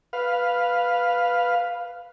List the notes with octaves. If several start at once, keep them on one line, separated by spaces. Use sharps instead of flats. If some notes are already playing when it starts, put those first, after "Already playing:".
B4 F5